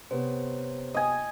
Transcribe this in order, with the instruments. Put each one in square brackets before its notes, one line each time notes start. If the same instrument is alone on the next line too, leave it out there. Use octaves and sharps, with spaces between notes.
[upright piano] C3 B3 [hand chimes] C5 C#5
[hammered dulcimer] D#5 G#5